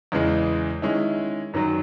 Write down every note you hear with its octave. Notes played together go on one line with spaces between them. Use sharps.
E2 C#3 E3 G#3
D#3 G#3 C#4 E4
F#2 D#3 F#3